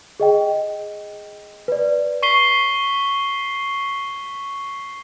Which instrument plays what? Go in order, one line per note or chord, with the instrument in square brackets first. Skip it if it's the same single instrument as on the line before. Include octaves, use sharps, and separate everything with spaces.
[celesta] G#4 D#5 G5
B4 D5
[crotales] C#6 B6 C7 G7